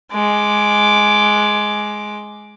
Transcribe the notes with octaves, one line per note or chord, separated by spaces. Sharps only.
G#3 D6